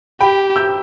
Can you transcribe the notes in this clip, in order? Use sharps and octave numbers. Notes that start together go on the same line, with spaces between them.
G4 G5 B5
E6 G6